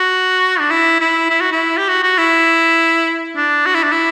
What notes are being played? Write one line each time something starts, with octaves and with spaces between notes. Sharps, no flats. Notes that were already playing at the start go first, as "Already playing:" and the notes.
Already playing: F#4
D4
E4
E4
E4
F#4
E4
G4
F#4
F#4
E4
D4
F#4
E4
D4
E4